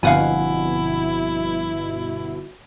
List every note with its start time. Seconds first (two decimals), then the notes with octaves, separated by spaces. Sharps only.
0.03 G1 F2 B2 D3 E4 F5 F#5 G#5